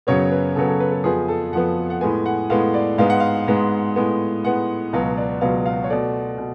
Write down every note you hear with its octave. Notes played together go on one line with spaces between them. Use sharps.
F#2 C#3 F#3 B3 C#5
B4
F#2 C#3 F#3 B3 A4
A4
B4
A4
F2 F3 B3 G#4
A4
F2 F3 B3 F#5
F#5
A2 G#3 B3 G#5
F#5
A2 G#3 B3 F5
D5
G#2 G#3 B3 F5
F#5
F5
G#2 G#3 B3
A2 G#3 B3
A2 G#3 B3 F#5
C#2 B2 F#3 B3 F5
D5
C#2 B2 F#3 B3 F5
F5
C#5
B2 A3 D5
B2